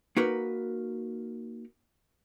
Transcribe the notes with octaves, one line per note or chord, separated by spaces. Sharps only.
A#3 D#4 F#4 A#4 B4